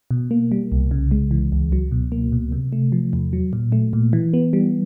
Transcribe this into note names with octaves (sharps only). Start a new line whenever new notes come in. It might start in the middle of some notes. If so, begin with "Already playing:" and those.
B2
A#3
G3
C2
C#3
G#3
E3
C#2
F#3
B2
A#3
B2
C3
A3
F3
E2
F#3
A#2
A3
A#2
E3
B3
G3